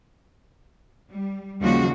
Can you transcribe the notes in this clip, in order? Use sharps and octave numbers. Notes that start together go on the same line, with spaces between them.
G3
D#2 C#3 F3 G3 A#3 F#4